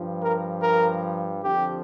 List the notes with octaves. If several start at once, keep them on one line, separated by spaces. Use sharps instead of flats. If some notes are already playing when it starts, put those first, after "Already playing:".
Already playing: G2 F3
A#4
A#4
F2 D3 F3 G4